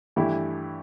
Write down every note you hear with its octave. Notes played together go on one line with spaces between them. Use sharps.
G2 E3 A3 E4 G4